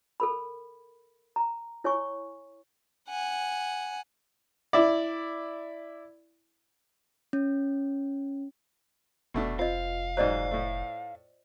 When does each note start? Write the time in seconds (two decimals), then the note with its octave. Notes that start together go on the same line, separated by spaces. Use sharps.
0.20 A4 A#4 B5
1.36 A#5
1.84 E4 C#5 G#5 C#6
3.09 F#5 G#5
4.73 E4 D5
7.33 C#4
9.34 F1 B2 A3 D4
9.59 C4 F4 D#5 F5
10.17 G#2 F#3 C5 D5 D#5
10.51 A2 A3